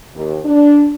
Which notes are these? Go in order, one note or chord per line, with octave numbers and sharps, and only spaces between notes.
D#2
D4